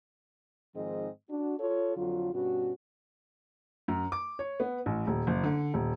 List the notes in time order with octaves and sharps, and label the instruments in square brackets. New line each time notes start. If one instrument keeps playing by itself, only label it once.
[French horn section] G#2 D#3 F3 C4 G#4 D#5
D4 F#4
F4 A4 C#5
F2 D3 F#3 F4
G2 B2 C#4 F#4
[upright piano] F#2
D6
C#5
B3
A1
D#1
F#1
D3
D#1